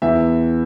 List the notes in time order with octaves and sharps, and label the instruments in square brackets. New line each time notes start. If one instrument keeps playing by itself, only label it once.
[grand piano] E2 E3 E5